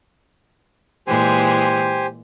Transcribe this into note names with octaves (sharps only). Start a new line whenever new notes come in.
A#2 E3 G#3 G4 C5 G#5